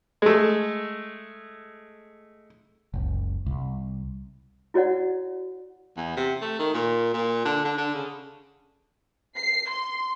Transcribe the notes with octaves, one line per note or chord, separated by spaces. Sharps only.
G#3 A3
F#1 C#2
C2
E4 F#4 C#5 D5 F#5
E2
C3
A3
D#3
A#2
A#2
D3
D3
D3
C#3
C7
C6